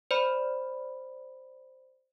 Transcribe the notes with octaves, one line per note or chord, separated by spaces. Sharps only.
C5 D5 B5